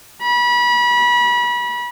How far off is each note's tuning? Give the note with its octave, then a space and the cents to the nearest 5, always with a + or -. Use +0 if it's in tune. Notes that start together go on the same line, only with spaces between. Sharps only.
B5 -30